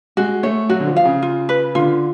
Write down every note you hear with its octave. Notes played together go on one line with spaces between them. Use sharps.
G#3 F#4
A3 C#5
F#3 F#4
D3
F3
F5
C#3
F4
B4
D3 F4